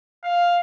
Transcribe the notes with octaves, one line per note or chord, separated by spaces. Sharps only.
F5